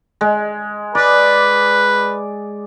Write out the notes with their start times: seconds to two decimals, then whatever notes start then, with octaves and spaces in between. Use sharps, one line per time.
0.21 G#3
0.95 B4 D5